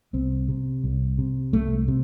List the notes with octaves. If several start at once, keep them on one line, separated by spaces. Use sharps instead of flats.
C2 C4
C3
C2
C3
C2 A3
C3